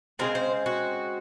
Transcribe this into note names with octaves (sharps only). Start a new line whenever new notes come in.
C#3 F3 G#3 C4 A#4
C5
F#4